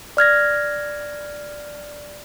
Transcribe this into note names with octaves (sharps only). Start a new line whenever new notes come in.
D5 F6 G#6 A#6